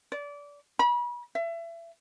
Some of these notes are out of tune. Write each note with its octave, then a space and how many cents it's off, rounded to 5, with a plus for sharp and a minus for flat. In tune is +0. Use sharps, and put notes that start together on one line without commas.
D5 -25
B5 -35
E5 +30